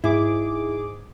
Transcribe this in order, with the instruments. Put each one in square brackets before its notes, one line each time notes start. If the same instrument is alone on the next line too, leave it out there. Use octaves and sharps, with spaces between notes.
[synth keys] G#2 G#4 D6 [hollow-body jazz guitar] E4